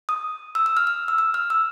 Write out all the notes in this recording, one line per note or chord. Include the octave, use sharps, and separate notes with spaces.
D#6
E6
E6
F6
F6
E6
E6
F6
E6